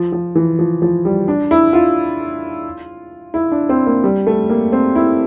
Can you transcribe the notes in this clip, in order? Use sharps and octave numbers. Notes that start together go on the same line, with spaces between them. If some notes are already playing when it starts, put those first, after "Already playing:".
Already playing: F3
F3
E3
F3
F3
G3
D4
E4
F4
E4
D4
C4
A#3
G3
A3
A#3
C4
E4